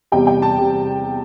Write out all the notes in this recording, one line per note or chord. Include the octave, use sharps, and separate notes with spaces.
E2 C3 G3 G5
G5
A5
C3 G3